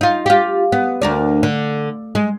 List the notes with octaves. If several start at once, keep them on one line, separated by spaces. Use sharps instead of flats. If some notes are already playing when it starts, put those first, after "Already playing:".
D#4 F4
F4 G4
B3
D2 A#4 D5
D3
G#3